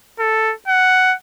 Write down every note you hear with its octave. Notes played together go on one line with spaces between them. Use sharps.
A4
F#5